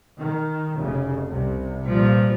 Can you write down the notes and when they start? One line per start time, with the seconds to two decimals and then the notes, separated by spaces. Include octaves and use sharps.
0.17 D#3
0.76 F1 C#3
1.28 C2 C3
1.86 G2 A#2 F3